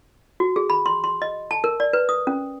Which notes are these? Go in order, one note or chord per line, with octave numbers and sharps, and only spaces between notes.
F#4
G#4
B5
C6
C6
D#5
A5
A#4
D5
B4
D#6
C#4